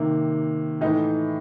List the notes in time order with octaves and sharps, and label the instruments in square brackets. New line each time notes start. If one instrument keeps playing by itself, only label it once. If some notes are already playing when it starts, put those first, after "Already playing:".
Already playing: [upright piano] C3 D#3 A#3
A2 E3 D#4